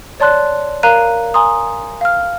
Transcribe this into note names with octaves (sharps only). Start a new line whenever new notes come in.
C#5 D5 A5 C6 F#6
A#4 F5 A#5 F#6 D#7
G#5 A#5 C6 D#6
F5 F6